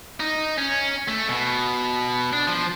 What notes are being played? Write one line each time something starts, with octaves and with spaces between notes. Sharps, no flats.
D#4
C#4
A3
B2
D4
F3